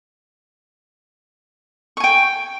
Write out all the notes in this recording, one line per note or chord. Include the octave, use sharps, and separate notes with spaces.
G5 G#5 C#6